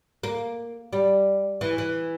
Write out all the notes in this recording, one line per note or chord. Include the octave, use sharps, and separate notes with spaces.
A#3
G3
E3
E3